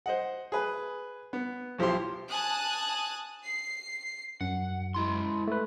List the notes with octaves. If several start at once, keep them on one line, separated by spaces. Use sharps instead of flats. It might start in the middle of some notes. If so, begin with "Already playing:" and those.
C5 D#5 F#5
G#4 B4
B3
B1 F3 E4 G4 C6
G#5 A5 D#6 F#6
C7
F#2 F#5
G#3 E4 C6
A3 B4